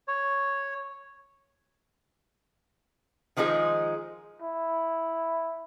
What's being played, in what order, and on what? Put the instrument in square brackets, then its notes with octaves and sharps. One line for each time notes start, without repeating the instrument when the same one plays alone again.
[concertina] C#5
[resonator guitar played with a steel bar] D#3 F3 G#3 D#4 G#4
[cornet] E4